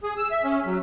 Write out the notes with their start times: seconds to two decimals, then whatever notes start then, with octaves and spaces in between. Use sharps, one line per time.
0.03 G#4
0.17 E6
0.31 E5
0.44 C#4
0.66 F#3